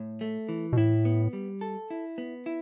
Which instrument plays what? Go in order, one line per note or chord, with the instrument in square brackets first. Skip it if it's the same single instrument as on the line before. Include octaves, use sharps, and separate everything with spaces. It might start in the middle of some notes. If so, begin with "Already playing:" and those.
Already playing: [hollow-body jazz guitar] A2
A3
E3
[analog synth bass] B2
[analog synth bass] A2 [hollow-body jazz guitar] E4
[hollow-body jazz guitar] B3
G3
A4
E4
B3
E4